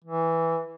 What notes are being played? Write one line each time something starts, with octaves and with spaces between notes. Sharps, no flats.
E3